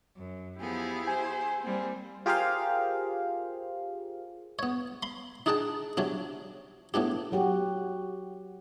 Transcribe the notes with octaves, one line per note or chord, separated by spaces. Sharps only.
F#2
F3 B3 E4 G4 G#4
C5 G#5
G3 A#3 C4
F4 G4 G#4 A#4 C5 F5
B3 C#5
B5 C6
D4 D#4 G#4 F#5 G5 A5
C3 F#3 C#4 D4
A2 B3 D4 G4
F#3 F#4 G4